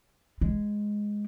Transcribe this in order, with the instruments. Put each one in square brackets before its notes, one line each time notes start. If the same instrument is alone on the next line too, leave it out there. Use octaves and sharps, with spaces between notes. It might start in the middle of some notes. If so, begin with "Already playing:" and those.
[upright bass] G#3